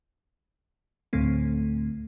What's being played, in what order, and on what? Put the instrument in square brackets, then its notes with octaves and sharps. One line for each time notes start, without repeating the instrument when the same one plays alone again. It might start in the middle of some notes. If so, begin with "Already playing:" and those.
[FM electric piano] D2 A2 D3 A3 C4